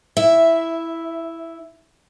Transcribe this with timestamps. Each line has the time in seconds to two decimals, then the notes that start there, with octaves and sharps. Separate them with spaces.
0.17 E4 E5